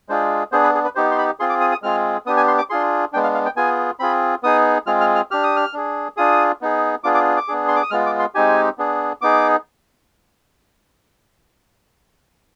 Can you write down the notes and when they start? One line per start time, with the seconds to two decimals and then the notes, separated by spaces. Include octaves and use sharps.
0.09 G#3 D4 F4 G#4 C5
0.52 B3 D4 G#4 C5
0.63 B4
0.75 G#4
0.84 B4
0.95 B3 D#4 G4 C5
1.11 C6
1.18 B5
1.40 C4 F4 G#4 C6
1.50 D6
1.61 D#6
1.72 D#6
1.82 G#3 C4 F4 G#4 F6
2.26 B3 D4 G4 D#6
2.37 G#5
2.48 C6
2.58 D6
2.70 D4 F4 G#4 C6
3.13 G#3 B3 D4 G5
3.23 F5
3.34 F5
3.45 G5
3.56 B3 F4 G#4 G#5
3.99 C4 F4 G#4 B5
4.43 B3 D#4 G#4 D#6
4.86 G#3 C4 F4 G#4 F6
5.01 F6
5.15 F6
5.31 D4 G4 F6
5.44 D#6
5.56 F6
5.73 D4 G#4
6.17 D4 F4 G#4 D#6
6.61 B3 D#4 G#4
7.04 B3 D4 F4 G#4 D6
7.14 D6
7.37 D6
7.48 B3 D4 G#4
7.68 C6
7.76 D6
7.83 D#6
7.91 G#3 B3 F4 F6
8.06 D6
8.19 C6
8.35 G#3 C4 D#4 G4 G#5
8.78 B3 D4 G#4
9.21 B3 D#4 G#4 D6